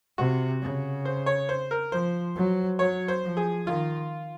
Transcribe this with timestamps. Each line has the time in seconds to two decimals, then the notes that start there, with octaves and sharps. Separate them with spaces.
0.18 C3 F#4
0.62 C#3
1.05 C5
1.26 C#5
1.49 C5
1.71 A#4
1.92 F3 C5
2.35 F#3
2.79 F#3 C#5
3.08 C5
3.23 F3
3.37 G#4
3.66 D#3 F4